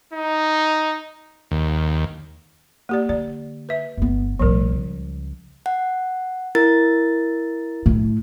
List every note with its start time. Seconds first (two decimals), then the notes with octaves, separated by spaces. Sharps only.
0.13 D#4
1.51 D#2
2.89 A#3 G4 D5
3.09 D3 D5
3.69 B4 E5
3.97 G1 B3
4.39 B1 A2 F3 G3 A#4
4.72 C#2 C#3
5.66 F#5
6.55 E4 A#4 A6
7.86 A2